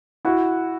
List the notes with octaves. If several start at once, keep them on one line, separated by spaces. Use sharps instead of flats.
E4 F#4